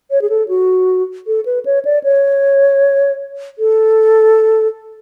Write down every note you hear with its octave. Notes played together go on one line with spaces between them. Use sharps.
C#5
G#4
A4
F#4
A4
B4
C#5
D5
C#5
A4